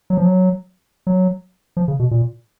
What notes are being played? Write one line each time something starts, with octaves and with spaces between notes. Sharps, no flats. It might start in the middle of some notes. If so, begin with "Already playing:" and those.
F#3
F3
F#3
F#3
F3
C#3
B2
A#2